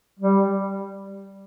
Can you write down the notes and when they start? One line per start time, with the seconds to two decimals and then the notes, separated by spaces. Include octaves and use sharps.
0.19 G3